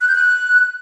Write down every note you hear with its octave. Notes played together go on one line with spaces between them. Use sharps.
F#6
G6
F#6